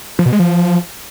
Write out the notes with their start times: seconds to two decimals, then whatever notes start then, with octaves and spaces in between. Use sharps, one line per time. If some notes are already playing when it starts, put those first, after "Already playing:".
0.19 F3
0.26 B2
0.33 G#3
0.39 F3